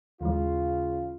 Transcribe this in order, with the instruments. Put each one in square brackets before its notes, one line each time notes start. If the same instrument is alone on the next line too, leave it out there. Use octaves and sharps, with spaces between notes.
[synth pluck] D#2 E3 G#3 [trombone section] C#3 F4